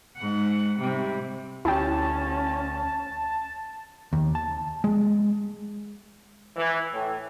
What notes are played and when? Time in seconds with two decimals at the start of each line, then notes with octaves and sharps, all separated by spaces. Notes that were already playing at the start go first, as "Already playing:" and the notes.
0.16 G#2 F#5
0.78 C3 G3
1.65 D2 C#4 E4 G4 A5
4.13 D#2
4.35 A5
4.84 G#3
6.57 E3
6.91 A2